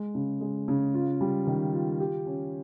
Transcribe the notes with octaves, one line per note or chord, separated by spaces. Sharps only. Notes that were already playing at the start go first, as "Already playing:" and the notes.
Already playing: G#3
C#3
G#3
C#3
F4
G3
D#3
F4
G4
C#4